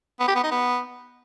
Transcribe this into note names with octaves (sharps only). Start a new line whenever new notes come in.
B3
G4
B3
D#4
B3